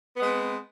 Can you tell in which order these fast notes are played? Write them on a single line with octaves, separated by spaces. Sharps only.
B3 G#3 C4